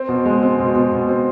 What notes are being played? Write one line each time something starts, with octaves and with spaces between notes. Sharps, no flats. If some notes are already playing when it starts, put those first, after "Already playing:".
Already playing: C4
B2
G#3
C4
B2
B2
B2
C4